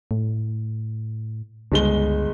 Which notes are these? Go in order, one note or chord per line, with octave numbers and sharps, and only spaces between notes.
A2
G1 C#2 G#3 G7